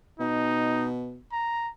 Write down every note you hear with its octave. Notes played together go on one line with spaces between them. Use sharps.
B2 D#4
A#5